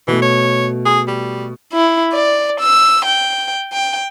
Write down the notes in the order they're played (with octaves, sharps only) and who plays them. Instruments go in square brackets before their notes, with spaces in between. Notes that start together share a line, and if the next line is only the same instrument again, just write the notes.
[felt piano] B2 A3 [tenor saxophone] E3
[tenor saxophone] C#5
G#4
G3
[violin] E4
D5
E6
G5
G5